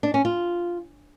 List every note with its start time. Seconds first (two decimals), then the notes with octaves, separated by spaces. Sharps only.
0.03 D4
0.14 C#4
0.25 F4